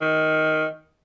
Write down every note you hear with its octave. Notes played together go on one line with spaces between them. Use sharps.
D#3